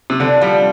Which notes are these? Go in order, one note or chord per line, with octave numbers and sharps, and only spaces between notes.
C3
D3 D4
F3 G3